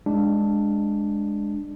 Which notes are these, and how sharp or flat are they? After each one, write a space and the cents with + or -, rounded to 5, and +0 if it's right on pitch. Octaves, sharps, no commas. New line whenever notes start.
G#3 -5 D4 +0